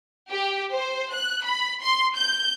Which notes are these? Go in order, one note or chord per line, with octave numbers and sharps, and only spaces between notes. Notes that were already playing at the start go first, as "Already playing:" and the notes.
G4
C5
F#6
B5
C6
G6